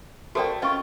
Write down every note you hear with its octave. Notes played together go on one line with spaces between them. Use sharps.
A3 F#4 A4 A#4 C5 D5 G5
C#4 F4 D#5 G5 C#6